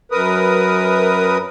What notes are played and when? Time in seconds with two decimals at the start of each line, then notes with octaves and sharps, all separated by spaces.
0.12 F#2 A#4 B4 D#6